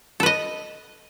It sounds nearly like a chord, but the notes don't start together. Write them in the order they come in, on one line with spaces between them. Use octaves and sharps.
A4 B4 D#5